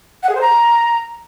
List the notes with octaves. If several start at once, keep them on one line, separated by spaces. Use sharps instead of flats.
F#5
G#4
C5
A#5